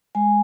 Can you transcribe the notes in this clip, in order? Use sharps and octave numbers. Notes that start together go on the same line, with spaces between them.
G#3 G#5